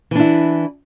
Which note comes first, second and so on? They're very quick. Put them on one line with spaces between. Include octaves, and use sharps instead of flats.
E3 D4 E4